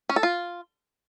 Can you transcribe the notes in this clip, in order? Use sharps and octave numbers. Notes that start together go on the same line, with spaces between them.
C#4
A4
F4